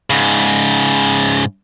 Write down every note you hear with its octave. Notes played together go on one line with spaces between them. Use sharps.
G#2 C#3